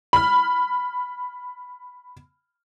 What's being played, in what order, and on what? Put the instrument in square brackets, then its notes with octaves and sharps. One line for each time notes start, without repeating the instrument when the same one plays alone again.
[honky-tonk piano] B5 F6